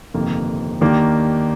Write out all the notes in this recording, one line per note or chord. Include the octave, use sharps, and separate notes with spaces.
G1 F2 C3 D#3 A#3
D#2 D#3 A#3 D4 G4